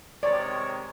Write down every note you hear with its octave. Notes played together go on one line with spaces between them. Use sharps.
C3 D#3 G#3 C#5 D5